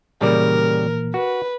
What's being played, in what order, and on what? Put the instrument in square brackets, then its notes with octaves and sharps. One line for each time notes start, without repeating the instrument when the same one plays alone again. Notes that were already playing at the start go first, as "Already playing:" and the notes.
[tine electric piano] A#2 E3 A#3 [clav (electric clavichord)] C#3 G3 D5 [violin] A#4
[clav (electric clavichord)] F#4 [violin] B4